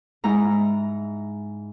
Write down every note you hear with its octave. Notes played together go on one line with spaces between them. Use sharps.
G#2 G#3 E4 A#5